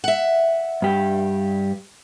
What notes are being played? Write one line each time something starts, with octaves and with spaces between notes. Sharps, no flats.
E5 F#5
G2 G4